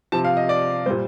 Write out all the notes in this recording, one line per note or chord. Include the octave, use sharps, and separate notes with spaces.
C3 F3 A5
F5
D#5
D5
A#2 G3 C5